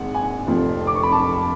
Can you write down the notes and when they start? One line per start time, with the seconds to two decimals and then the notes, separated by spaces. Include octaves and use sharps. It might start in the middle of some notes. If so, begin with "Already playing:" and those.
Already playing: G#1 G#2 F#5
0.14 G#5
0.47 F1 F2 F3
0.87 D6
0.95 C#6
1.03 B5
1.12 A5